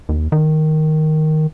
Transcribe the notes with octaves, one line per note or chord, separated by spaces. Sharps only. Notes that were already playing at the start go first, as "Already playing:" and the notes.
D#2
D#3